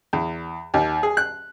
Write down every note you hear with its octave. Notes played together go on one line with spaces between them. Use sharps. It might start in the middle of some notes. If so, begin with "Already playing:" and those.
E2
D#2
G#4
F#6